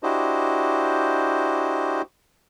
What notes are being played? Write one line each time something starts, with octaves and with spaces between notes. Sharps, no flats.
D4 E4 F#4 G4 C5 D#5